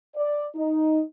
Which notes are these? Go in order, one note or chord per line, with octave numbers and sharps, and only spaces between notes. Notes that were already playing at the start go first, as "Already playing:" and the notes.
D5
D#4